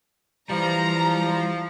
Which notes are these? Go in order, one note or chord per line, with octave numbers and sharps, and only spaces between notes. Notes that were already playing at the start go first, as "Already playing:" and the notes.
E3 F3 G3 A#5